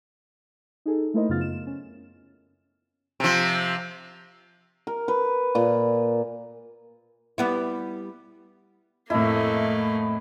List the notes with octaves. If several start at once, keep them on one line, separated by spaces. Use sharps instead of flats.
D#4 G#4 A4
A3 A#3 E4 A#4 C5 D#5
F#2 C#3 B3 F4 F6 A6
E7
C#4
C3 F3
A#4
B4
A#2
G3 B3 E4
F2 A2 A3 A#3 E4 D#5